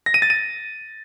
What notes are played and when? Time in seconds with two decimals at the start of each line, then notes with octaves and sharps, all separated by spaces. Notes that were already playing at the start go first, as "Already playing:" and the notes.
0.06 A#6
0.14 D#7
0.22 A6
0.30 D#7